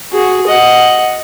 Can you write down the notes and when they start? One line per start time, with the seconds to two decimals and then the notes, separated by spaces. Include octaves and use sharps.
0.12 F#4 G#4
0.47 D#5 F#5